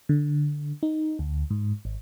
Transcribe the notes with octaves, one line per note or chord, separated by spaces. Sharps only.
D3
D#4
D2
G#2
G#1